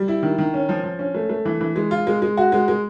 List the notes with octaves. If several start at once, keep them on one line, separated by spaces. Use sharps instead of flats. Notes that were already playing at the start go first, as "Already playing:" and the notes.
Already playing: G3
E4
D#3
D#3
C#4
F3
F3
C#4
A3
A3
E3
E3
G#3
F4
G#3
G#3
F#4
G#3
G#3